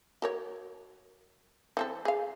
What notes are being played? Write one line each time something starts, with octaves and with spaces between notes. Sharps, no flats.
F#4 A#4 C#5
E3 C4 A4
G#4 F5